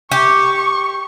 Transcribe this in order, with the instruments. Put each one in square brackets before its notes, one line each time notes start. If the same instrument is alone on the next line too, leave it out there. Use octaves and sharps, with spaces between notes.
[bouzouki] G4 [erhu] C#6